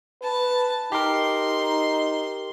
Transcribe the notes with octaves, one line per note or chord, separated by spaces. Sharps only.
B4 A5
D#4 G4 A#4 C6